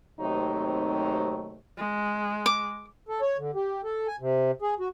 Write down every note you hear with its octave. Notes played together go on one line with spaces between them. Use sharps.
D#2 C3 F#3 A3 C4 D#4
G#3
D6
A4
C#5
D3
G4
A4
G#5
C3
G#4
F#4